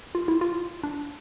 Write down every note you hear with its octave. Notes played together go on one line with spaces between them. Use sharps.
F4
E4
F4
D4